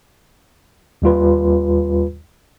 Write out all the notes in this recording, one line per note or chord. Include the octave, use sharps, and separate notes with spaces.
D#2 G3 F4 B4